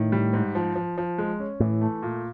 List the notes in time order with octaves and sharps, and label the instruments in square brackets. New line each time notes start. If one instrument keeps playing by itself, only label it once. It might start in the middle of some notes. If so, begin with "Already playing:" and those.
Already playing: [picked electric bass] A2 [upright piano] D#3
[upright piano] G3
G#2
F3
F3
F3
G#3
C#4
[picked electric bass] A2 [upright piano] E3
[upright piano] A3
A#2